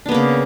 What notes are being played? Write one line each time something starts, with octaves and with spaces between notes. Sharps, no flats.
C#3 A#3 B3 D4